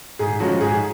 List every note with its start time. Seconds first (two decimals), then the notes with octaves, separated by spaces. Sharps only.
0.19 G#2 G#4
0.40 F3 G#3 C#4 F#4
0.51 F#4
0.61 G#2 G#4